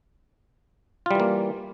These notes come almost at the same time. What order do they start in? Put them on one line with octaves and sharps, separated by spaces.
F4 G3 E3 A#3